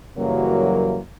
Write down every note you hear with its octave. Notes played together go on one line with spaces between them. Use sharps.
F#2 C#3 E3 F#3 G3 A#3